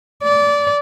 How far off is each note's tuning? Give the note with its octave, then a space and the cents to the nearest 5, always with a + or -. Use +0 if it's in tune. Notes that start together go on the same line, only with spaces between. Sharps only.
D5 -20